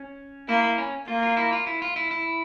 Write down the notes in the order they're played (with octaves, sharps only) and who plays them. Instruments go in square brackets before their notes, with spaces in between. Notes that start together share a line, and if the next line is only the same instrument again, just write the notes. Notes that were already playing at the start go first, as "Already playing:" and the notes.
Already playing: [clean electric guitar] C#4
[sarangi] A#3 [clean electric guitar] E4
[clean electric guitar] E4
C#4
[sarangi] A#3 [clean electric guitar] F4
[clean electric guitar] F4
E4
F4
E4
F4
E4
E4